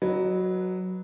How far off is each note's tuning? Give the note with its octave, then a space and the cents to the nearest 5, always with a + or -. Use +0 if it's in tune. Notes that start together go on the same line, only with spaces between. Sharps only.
F#3 +0 B4 -10 D#5 -35